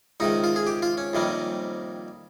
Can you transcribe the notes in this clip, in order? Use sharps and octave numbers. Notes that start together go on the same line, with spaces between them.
C#2 C3 D#3 D#4
F4
G#4
G4
F4
C#4
F2 C3 D#3 G3 A#3